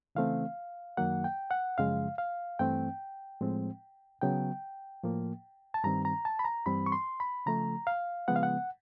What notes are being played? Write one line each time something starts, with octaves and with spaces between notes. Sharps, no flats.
C#3 E3 A3 C4 F5
F#2 D#3 F#3 A#3 F#5
G5
F#5
F#2 C#3 F3 G#3 F5
F5
G2 E3 A3 C4 G5
A2 F3 G#3 C4
C#3 F#3 B3 G5
A2 F3 A#3
A5
G2 D#3 G3 C4 A#5
A#5
A5
B5
A#5
G2 E3 G3 C4 B5
C#6
C6
B5
C#3 F3 A3 A#5
F5
C#3 F3 G#3 B3 F#5
F5
F#5